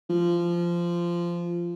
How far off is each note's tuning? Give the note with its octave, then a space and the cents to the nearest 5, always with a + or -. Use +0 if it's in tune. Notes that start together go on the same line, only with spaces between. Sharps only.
F3 -15